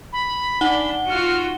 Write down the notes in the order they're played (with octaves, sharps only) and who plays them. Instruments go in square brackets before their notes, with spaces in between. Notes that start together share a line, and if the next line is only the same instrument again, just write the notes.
[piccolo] B5
[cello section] D4 [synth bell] D#4 F#5 G7
[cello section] F4 F#4 [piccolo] F6